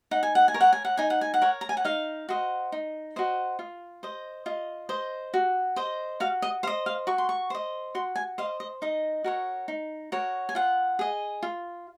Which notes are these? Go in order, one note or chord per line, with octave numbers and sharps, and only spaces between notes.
D#4 F#5
G#5
F#5
G#5
A#4 C#5
F#5
G#5
F#5
D#4 G#5
F#5
G#5
F#5
A#4 C#5
A#5
G#5
F#5
D#4 F5
F#4 C5 D#5
D#4
F#4 C5 D#5
F4
C5 D#5
F4 D#5
C5 D#5
F#4
C5 D#5
F#4 F5
D#5
C5 D#5 F5
F5
F#4 C#6
C6
C#6
C5 D#5
F#4 C6
G#5
C5 D#5 F5
D#5
D#4 D#5
F#4 A#4 C#5
D#4
F#4 A#4 C#5
G#5
F4 F#5
G#4 D#5
F4